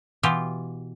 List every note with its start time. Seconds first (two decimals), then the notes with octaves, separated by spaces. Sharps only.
0.23 B2 E3 F4 G4